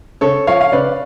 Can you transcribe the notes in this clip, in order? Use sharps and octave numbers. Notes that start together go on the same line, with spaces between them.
C#3 A4 C#5
F3 C#5 F5
F5
C#3 B4 D5